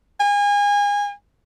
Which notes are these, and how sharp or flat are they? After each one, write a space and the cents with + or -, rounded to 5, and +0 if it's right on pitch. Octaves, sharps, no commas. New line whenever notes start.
G#5 -30